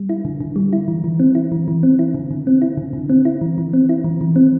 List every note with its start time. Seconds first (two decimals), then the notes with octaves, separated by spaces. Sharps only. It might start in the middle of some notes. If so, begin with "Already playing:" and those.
Already playing: G3
0.09 E4
0.25 D3
0.40 D3
0.56 G3
0.73 E4
0.88 E3
1.04 E3
1.20 C4
1.35 E4
1.52 E3
1.68 E3
1.83 C4
1.99 E4
2.14 D3
2.31 D3
2.47 C4
2.62 E4
2.77 D3
2.93 D3
3.09 C4
3.25 E4
3.41 E3
3.58 E3
3.73 C4
3.89 E4
4.04 E3
4.21 E3
4.36 C4